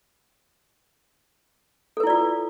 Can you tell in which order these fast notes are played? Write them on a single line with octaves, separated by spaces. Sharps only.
A4 B4 E4 D5 F4